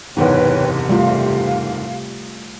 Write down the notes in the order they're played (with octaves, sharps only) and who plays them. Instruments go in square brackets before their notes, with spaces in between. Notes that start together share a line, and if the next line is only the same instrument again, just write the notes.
[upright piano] F#1 E2 G#2 [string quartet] C3 [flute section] B4 C#5 G5
[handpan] G3 A3 F4 [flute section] F5